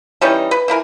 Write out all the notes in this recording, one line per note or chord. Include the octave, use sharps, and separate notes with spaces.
E3 G3 C#4 D#4
B4
E3 E4 A#4 G#5